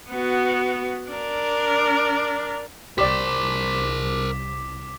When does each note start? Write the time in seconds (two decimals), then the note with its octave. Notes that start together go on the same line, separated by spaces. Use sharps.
0.10 B3 F#4
1.10 D4 A#4
2.98 C2 G4 A#4 C5 D5 D6 B6